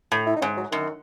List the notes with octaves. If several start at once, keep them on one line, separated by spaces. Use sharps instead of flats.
A2
E4
D#4
G#2 C#4
F#3
F#2 D#3